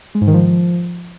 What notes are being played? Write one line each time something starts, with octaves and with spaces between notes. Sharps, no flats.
G#3
G#2
D#3
F3